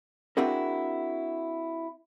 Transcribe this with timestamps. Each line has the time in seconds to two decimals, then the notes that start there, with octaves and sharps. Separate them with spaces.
0.37 C4 D4 E4 F#4 G#4 A#4